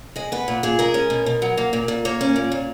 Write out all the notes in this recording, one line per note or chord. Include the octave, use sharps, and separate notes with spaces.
G#3 D#5
B3 B4
A#2
A#2 G#4
G#3 A#4
C#4
B2
B2
F#3
A#3
A#2
A#2
A#3 C#5
C#4
A#2
A#2